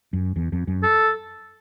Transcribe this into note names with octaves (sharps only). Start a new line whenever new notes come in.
F#2
E2
F2
F#2
A4